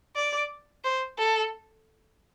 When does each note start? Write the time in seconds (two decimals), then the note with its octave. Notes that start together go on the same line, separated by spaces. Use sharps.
0.16 D5
0.84 C5
1.18 A4